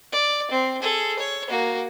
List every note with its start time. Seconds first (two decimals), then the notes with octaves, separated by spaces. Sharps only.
0.12 D5
0.52 C4
0.82 G#4 A4
1.19 C#5
1.49 A#3 F#4